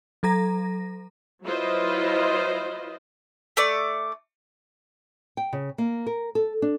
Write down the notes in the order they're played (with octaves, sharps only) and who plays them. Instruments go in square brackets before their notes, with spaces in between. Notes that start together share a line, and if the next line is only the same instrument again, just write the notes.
[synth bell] F#3 A4 A#5 A#6
[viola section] F#3 E4 F4 B4 C5 D#5
[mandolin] A3 D5
[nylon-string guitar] G5
C#3
A#3
A#4
A4
D4